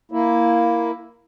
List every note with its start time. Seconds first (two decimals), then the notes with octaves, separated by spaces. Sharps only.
0.12 A#3 E4